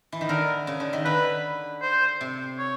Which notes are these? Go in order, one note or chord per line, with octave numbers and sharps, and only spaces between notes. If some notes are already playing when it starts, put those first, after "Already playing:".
E3
D#3
D3 A#4
C#3
D3
D#3
D3 B4
C5
C3
C#5